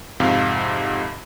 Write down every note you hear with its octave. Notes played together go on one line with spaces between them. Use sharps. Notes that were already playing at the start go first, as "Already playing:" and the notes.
F2 G#2 C3 F5